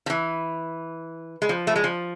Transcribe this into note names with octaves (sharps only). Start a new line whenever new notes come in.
F3
E3
G#3
F3
A3
G#3
F3